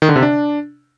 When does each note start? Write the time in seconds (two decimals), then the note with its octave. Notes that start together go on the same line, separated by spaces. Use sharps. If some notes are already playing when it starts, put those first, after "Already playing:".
0.02 D#3
0.09 D3
0.16 C3
0.23 D4